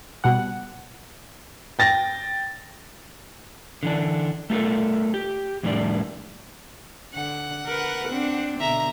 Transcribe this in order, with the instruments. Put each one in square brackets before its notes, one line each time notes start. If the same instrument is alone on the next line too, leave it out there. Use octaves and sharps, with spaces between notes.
[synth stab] B2 G3 F#5
[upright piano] G5 A6 A#6
[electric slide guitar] D3 E3 D4
A3 F4 G4 A4 A#4
G4
F2 A2 D#3 G3 D5
[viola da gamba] D3 [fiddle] F#5
[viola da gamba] A#4 B4
C4 D4
[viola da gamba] B2 D3 [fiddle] E5 A#5